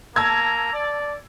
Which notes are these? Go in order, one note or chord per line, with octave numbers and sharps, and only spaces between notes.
A#3 A5 A#5 E6 G#6
D5